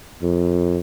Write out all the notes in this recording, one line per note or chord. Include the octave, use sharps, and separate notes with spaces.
F2